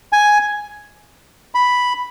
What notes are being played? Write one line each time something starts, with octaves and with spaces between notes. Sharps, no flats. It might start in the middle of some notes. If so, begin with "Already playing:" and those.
G#5
B5